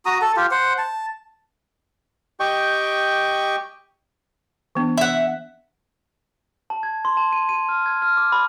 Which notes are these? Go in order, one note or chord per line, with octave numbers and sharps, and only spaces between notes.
F#4 A#5 D#6
A4 A5
F4 G4
C5 F#5
A5
G4 D#5 G5 C#6
E3 B3 D4
E5 F#5
A5
G#6
C6
A5
D#7
D#7
F6
G#6
F6
D6
B5